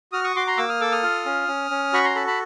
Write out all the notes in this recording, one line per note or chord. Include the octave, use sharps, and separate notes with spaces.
F#4 D#6 F6
C#6 D#6
F#4 C6 D6
A#5 C6
A#3 D6 E6
D#6 F6
A4 D6 E6
D#6 F6
F4
C#4
C#4
C#4
F#4 B5 C#6
A#5 C6
A4 A5 B5
A5 B5